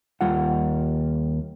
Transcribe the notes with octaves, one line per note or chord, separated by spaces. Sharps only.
D#2 G3 F4 F#5